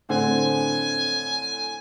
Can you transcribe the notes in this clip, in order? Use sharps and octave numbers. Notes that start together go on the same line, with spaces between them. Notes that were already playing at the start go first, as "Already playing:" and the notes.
A2 D3 C4 G#5